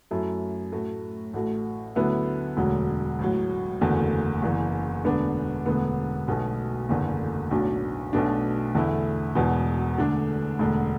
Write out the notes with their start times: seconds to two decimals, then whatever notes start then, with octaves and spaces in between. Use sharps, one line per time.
0.11 F#2 F#3 A3 E4
0.72 A2 A3 F#4
1.33 A1 A2 A3 F#4
1.95 D2 D3 F#3 B3 E4
2.57 E1 D2 D3 F#3
3.19 A1 A2 F#3
3.81 F#1 E2 D3 A3 F#4
4.42 F#1 E2 E3
5.04 E1 D2 D3 B3 D4
5.66 E1 D2 D3 B3
6.28 B1 B2 A3
6.89 F#1 E2 D3 A3
7.51 B1 A2 F#3 D4 F#4
8.13 B1 B2 A3 D4
8.75 E2 D3 A3 E4
9.35 E1 E2 B2
9.98 D2 D3 A3 D4
10.59 E1 D2 D3